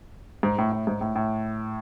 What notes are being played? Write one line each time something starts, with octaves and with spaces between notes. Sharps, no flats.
G#2
A2
A2
G#2
A2
A2